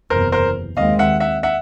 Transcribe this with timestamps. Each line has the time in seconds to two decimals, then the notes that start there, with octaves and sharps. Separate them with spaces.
0.10 F#1 E2 C3 A#4 C5
0.32 A#4 C5
0.77 D#2 D#3 G#3 C4 D#5 F5
0.99 E5 F#5
1.20 E5 F#5
1.43 E5 F#5